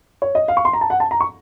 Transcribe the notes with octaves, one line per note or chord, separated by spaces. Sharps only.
C#5
D#5
F5
C#6
C6
A#5
A5
F#5
A5
A#5
C#6